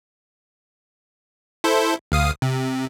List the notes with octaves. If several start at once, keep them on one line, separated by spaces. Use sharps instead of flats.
E4 A4 C5
D2 F5 D#6
C3